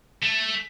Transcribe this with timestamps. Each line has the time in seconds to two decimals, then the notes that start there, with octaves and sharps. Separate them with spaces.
0.22 A3